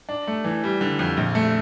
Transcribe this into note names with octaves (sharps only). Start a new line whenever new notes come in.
D4
A3
E3
G3
D3
F2
A#1
A3